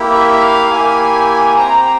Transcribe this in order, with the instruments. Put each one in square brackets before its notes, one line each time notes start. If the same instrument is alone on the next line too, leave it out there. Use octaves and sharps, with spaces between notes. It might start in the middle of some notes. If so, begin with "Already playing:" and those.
Already playing: [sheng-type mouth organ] A#3 E4 G4
[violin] E5
F5
[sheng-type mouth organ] A#3 E4 G4 [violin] G#5
[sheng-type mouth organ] C4 G4 C5 G5 [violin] A#5